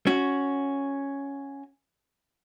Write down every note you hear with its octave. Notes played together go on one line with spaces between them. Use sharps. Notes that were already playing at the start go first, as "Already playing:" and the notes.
C#4 F#4